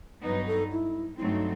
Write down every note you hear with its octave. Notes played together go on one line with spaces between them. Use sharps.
G2 F#3 B3 D#4 B4
A4
E4
G2 F#3 A3 C4 D#4 E4